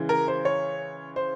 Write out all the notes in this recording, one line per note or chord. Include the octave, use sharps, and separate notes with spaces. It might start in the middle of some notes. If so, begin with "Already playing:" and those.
Already playing: C#3 E3 G#3
A#4
C5
C#5
C5